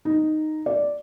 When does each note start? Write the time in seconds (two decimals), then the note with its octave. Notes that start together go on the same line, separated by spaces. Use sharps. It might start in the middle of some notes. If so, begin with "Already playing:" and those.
0.05 D#4
0.66 D5